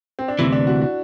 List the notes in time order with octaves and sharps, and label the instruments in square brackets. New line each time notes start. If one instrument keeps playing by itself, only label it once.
[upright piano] C4
D4
[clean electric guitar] D2 C3 E3 [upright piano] E4
[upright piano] D4
F#4
F#4